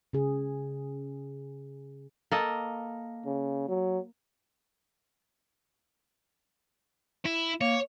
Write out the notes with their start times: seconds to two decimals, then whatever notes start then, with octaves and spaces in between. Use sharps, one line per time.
0.13 C#3 G#4
2.31 A#3 A4 D#5
3.26 C#3
3.68 F#3
7.25 E4
7.61 A#3 C#5